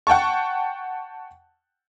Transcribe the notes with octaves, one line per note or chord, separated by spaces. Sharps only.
F#5 G5 A5 C#6